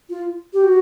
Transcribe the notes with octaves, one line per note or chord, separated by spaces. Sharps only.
F4
G4
F#4